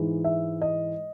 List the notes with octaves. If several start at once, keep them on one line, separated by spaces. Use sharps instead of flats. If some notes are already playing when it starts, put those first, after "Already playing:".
Already playing: G#2 E3 G#3
E5
D#5